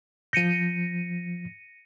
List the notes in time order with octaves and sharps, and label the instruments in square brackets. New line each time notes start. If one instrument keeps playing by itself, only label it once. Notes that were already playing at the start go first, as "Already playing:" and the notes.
[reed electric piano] F3 G6 [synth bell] A#6 C#7 D#7